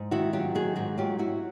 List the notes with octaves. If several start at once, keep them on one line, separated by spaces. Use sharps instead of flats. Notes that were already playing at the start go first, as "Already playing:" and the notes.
Already playing: G#2
D#3 E4 F#4
F#3 F4 G4
D#3 F#4 G#4
G#2 F#4 G#4
F#3 F4 G4
F#3 E4 F#4